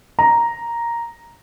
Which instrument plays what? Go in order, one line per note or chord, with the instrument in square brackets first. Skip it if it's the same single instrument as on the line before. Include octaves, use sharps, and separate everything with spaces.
[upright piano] A#5